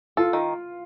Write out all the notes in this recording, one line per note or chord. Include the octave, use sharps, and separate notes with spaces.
F4 A4
D#3